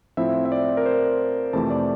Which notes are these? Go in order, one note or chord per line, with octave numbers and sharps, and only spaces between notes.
A2 F3 C4 E4 E5
E5
D5
A#4
C5
F2 C3 E3 A3 A5
D5